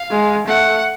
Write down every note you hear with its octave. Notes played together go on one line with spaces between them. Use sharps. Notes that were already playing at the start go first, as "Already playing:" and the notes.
Already playing: F5
G#3
A3 F#5